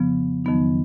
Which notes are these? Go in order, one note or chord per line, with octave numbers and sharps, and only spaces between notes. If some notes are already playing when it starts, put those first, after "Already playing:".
Already playing: F2 C#3 F3 B3
F2 D#3 F#3 B3 D#4